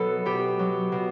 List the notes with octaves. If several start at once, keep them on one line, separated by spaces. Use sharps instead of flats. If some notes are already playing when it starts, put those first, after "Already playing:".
Already playing: B2 F#3 A4 B4
B2 G4
F#3
B2